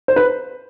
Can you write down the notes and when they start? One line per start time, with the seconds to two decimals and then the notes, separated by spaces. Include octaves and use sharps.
0.08 C5
0.16 B4